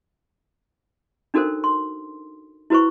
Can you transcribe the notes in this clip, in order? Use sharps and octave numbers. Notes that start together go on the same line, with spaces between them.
D4 D#4 F#4 A4 A#4 C5
C6
E4 F#4 B4 C5 C#6